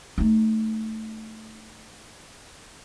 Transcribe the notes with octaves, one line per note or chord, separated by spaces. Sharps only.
A3 D#4